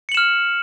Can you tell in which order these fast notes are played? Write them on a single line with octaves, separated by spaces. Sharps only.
C#7 F#7 E7 F6